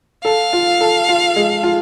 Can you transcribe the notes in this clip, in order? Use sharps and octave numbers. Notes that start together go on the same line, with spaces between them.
A4 F5
F4
A4
F4
G#3
F4